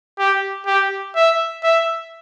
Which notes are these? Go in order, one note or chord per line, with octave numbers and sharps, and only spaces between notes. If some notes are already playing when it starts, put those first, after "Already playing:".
G4
G4
E5
E5